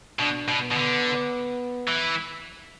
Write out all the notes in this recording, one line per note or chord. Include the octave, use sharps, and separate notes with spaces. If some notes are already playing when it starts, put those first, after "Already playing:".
B2 D4
B2
B3
B2
D3
E3